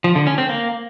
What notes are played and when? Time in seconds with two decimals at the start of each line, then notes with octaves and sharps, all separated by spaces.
0.04 F3
0.16 D3
0.27 C#4
0.38 C4
0.49 A#3